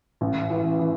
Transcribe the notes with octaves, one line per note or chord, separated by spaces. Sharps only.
A1
E3
E3